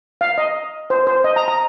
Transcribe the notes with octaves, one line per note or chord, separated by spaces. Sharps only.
F5
D#5
C5
C5
D#5
A#5
A#5